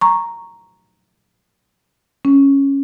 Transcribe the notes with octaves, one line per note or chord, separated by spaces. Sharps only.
A#5 C#6
C#4